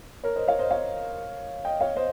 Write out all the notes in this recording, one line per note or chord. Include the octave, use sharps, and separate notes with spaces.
A#4 C#5
C5 D#5
C#5 F5
C5 D#5
C#5 F5
D#5 G5
C#5 F5
C5 D#5